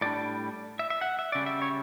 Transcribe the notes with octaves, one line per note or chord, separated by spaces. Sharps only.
A2 G3 D4 D5
E5
E5
F#5
E5
C#3 G3 C#4 D5
E5
C#5